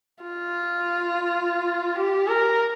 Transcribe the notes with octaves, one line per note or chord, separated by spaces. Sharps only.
F4
G4
A#4